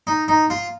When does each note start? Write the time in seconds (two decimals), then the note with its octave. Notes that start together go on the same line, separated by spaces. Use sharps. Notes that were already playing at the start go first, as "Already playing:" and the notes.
0.07 D#4
0.28 D#4
0.50 F4